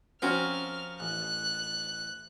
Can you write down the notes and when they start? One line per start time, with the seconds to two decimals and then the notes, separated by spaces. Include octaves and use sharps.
0.22 F3 C4 C#4 F4 F#4 A#4 F6
1.00 A1 F#6